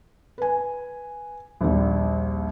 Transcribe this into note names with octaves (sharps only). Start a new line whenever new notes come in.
B4 G#5
A#1 D#2 G3